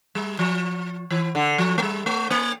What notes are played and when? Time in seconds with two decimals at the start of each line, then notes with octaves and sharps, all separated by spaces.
0.15 G3
0.39 F3
1.10 E3
1.35 D3
1.58 F3
1.78 A3
1.82 G3
2.06 A3
2.30 A#3